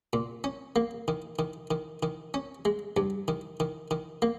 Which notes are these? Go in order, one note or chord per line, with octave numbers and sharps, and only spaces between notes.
A#2
C#4
A#3
D#3
D#3
D#3
D#3
C#4
G#3
G2
D#3
D#3
D#3
A#3